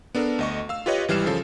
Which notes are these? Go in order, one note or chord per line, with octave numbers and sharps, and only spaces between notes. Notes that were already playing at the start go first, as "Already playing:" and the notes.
B3 D4 A4 A#4
D2 D#5 C#6
F5 E6
F4 G4 B4 C#5 D#5
G#1 E3 G3 F6 C7 E7
C#3 F3 A4